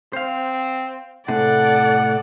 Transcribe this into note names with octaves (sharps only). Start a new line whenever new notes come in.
C4 C5 F5
A2 C3 G#4 A4 D5 F#5